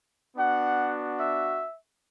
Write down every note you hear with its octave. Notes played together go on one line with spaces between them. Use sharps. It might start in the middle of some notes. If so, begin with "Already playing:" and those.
B3 D4 F#4 F#5
E5